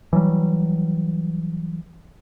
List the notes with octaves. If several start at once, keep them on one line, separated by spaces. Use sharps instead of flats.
E3 F#3 G3